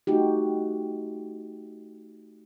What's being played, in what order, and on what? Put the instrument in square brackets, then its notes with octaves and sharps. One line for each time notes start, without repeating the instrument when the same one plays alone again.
[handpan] A3 D#4 F#4 G4